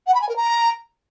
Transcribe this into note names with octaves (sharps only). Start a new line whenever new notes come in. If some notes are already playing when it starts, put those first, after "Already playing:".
F#5
B5
G#5
A#4
A#5